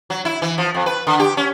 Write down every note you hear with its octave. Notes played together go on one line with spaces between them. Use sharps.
F#3
E4
E3
F3
F2
B4
D3
G4
C#4